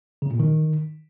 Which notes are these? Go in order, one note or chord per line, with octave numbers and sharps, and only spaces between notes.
C#3
A#2
D#3